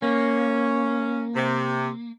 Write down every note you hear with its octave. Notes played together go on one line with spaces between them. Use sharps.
A#3 C#4
C3